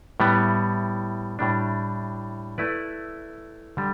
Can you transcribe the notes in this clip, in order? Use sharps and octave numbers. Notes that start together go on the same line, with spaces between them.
A2 G3 B3
A2 G3 D4
A3 E4 B4 D5
D3 G3